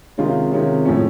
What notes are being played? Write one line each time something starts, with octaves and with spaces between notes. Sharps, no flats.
C3 D#3 G#3 C#4 F4
C3 D#3 G#3 C#4 F4
A2 F3 G#3 C#4